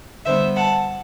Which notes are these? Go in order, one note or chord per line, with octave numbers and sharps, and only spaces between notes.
D3 G3 B3 C5 E5
F#5 A5